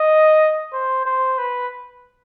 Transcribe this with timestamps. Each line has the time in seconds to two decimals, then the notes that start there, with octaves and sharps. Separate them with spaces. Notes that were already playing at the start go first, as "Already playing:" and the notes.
Already playing: D#5
0.73 C5
1.06 C5
1.38 B4